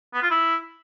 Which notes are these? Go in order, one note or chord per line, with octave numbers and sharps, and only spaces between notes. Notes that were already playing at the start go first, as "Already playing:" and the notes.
B3
F4
E4